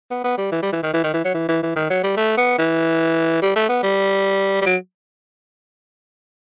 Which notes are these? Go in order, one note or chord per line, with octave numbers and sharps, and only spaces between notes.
B3
B3
G3
E3
G3
E3
D#3
E3
D#3
E3
F#3
E3
E3
E3
D#3
F#3
G3
A3
B3
E3
G3
A3
B3
G3
G3
F#3